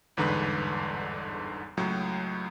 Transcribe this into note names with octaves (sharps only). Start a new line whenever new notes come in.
G1 E2 G#2 D3 B4 F#6
C#2 A2 F#3